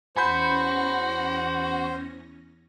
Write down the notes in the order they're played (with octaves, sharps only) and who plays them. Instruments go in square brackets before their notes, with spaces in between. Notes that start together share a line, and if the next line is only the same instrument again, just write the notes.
[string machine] E2 C#4 A#6 [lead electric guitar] F#4 [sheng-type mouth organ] C5 [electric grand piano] G#5 B5 G6